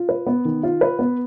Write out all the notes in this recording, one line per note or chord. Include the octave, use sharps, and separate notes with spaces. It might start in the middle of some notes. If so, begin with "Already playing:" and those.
Already playing: F4
B4
B3
D#3
F4
B4
B3